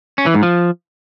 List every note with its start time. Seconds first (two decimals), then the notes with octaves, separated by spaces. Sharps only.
0.18 C#4
0.26 E3
0.34 G#2
0.43 F3